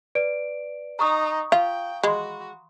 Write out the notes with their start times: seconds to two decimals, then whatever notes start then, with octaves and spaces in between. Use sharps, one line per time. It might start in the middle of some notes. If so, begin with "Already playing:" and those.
0.15 B4 D5 D7
0.99 D#4 A#5 C#6 D#6
1.52 F4 F5 G5
2.03 G#3 F#4 B5 C6